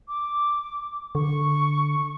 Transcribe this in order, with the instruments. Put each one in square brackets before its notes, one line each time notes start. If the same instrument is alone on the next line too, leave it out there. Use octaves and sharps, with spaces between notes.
[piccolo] D6
[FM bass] D3 [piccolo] C#6